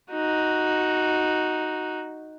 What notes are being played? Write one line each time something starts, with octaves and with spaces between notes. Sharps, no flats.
D#4 F#4